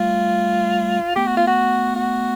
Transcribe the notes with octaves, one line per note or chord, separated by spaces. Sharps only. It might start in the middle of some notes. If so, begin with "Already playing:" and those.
Already playing: G3 A3 F4
A3 B3 G4
F#4
F4
F#4
F#4